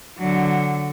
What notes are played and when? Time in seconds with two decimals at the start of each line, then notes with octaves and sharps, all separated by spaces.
0.18 D3 F#3